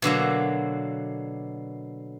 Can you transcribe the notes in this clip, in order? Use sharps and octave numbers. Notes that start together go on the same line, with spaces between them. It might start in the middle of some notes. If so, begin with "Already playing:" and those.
B2 D3 F#3 A#3